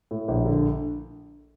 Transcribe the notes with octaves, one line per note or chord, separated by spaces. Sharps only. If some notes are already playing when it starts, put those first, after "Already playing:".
A2
A#1
D3